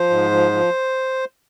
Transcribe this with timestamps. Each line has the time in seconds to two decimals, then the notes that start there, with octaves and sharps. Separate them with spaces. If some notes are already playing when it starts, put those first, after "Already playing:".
Already playing: F3 C5
0.10 G#2
0.31 F3
0.52 F3